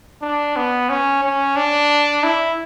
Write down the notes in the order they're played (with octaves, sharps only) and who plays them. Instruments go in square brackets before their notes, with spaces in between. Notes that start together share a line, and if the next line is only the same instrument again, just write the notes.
[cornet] D4
B3
C#4
C#4
D4
E4